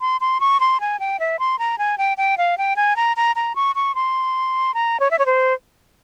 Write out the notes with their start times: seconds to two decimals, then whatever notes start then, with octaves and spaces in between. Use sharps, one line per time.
0.01 C6
0.21 C6
0.40 C#6
0.60 C6
0.81 G#5
1.00 G5
1.20 E5
1.39 C6
1.59 A#5
1.78 G#5
1.98 G5
2.17 G5
2.38 F5
2.58 G5
2.76 G#5
2.96 A#5
3.17 A#5
3.36 A#5
3.56 C#6
3.75 C#6
3.95 C6
4.74 A#5
5.00 C#5
5.11 E5
5.19 C#5
5.26 C5